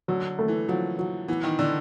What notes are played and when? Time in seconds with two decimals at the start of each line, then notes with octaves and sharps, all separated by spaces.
0.08 D3 F#3
0.39 A3
0.48 E3
0.68 F3 F#3
0.98 F#3
1.28 E3 B3
1.44 D#3
1.59 D3 D4